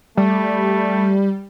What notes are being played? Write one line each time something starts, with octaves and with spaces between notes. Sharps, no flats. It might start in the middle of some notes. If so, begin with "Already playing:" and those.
G3 A3